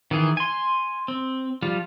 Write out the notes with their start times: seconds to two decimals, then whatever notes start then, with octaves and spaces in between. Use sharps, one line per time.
0.11 D#3 E3 G#4
0.37 G#5 C6
1.08 C4
1.62 F3 G3 F4